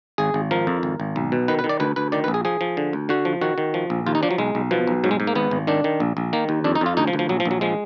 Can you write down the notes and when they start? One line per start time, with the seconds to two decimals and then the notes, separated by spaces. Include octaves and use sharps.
0.18 G#1 G#4
0.34 G#1
0.51 F3 A#4
0.67 F2
0.83 G#1
1.00 G#1
1.16 B1
1.32 B2
1.48 D#3 B4
1.59 B4
1.64 D#3
1.69 D5
1.80 D2 B4
1.96 D2 B4
2.12 D#3 D5
2.24 B4
2.28 A#1
2.34 G#4
2.45 F3 G#4
2.61 F3
2.77 D3
2.93 D2
3.09 D3 F#4
3.25 F3
3.41 D#3 F#4
3.58 D#3
3.74 F3
3.90 A#1
4.06 D#2 F4
4.15 D#4
4.23 F3 D4
4.31 F#3
4.38 B1 G#3
4.55 B1
4.71 B2 F3
4.87 B1
5.04 G#2 F#3
5.11 G#3
5.20 G#2
5.27 A#3
5.35 G#1 B3
5.51 G#1
5.67 D#3 D4
5.84 D#3
6.00 A#1
6.17 A#1
6.33 D#3 A#3
6.49 D#2
6.64 F2 D4
6.75 D#4
6.81 F2 F4
6.97 D2 D#4
7.07 F3
7.13 D2
7.19 F3
7.29 A#1 F#3
7.40 F3
7.46 A#1
7.51 F#3
7.61 F3 G#3